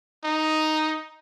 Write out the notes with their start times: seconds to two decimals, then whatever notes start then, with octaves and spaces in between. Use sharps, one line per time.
0.24 D#4